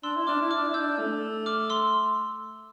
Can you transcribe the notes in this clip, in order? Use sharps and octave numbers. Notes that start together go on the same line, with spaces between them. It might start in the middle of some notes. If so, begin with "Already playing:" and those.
D4 C6 E6
E4
D4 D6 F6
E4
D6 F6
D4
E4
E6 G6
D4
A3
D6 F6
C6 E6